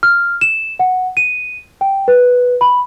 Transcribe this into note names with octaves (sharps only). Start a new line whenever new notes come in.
F6
E7
F#5
D#7
G5
B4
B5